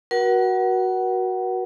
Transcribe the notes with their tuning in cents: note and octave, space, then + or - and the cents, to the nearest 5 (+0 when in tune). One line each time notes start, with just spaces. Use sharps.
F#4 +0 A#4 +45 F#5 +25